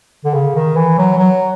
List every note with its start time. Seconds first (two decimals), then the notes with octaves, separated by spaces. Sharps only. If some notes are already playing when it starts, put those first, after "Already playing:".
0.25 D3
0.34 C#3
0.56 D#3
0.76 E3
0.98 F#3
1.18 F#3